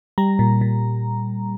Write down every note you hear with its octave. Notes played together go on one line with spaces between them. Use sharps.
G3 A#5
A#2
A#2